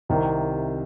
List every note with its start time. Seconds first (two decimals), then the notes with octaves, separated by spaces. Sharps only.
0.09 C2 C3 D#3